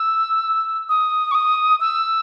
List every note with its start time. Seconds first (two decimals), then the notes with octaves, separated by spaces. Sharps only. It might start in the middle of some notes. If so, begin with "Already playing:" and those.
Already playing: E6
0.89 D#6
1.31 C#6
1.35 D#6
1.80 E6